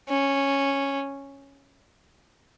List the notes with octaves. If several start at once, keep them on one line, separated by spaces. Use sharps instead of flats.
C#4